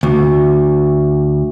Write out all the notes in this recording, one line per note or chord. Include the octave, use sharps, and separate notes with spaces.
D2